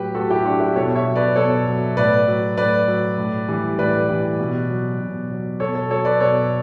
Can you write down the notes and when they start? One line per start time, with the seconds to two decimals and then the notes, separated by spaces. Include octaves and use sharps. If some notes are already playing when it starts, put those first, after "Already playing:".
Already playing: A2 F#3 G4 B4
0.15 A2 F#4 A4
0.30 E4 G4
0.45 F#3 D4 F#4
0.60 E4 G4
0.76 B2 A4 C#5
0.96 C#5 E5
1.06 F#3
1.16 B4 D5
1.36 B2 A4 C#5
1.66 F#3
1.97 A2 B4 D5
2.27 F#3
2.57 A2 B4 D5
2.87 F#3
3.18 A2
3.49 E3 G3
3.79 A2 B4 D5
4.08 E3 G3
4.39 B2
4.70 F#3
5.00 B2
5.30 F#3
5.60 B2 A4 C#5
5.75 A4 C#5
5.90 F#3 A4 C#5
6.05 B4 D5
6.20 B2 A4 C#5